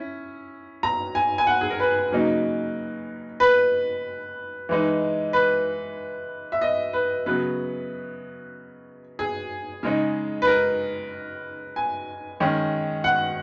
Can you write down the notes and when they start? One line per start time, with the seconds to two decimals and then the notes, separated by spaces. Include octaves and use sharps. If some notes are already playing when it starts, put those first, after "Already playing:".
Already playing: C#4 E4
0.83 A#5
1.15 G#5
1.38 G#5
1.47 F#5
1.61 G#4
1.70 A#4
1.80 B4
2.12 C#3 F#3 A#3 D#4
3.40 B4
4.69 E3 G#3 D#4
5.33 B4
6.52 E5
6.61 D#5
6.93 B4
7.26 C#3 F#3 B3 B4
9.19 G#4
9.83 C#3 G#3 D#4
10.42 B4
10.47 A#4
11.76 G#5
12.40 D#3 G#3 C#4
13.04 F#5